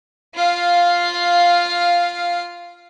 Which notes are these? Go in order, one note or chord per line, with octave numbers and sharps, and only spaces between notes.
F4 F5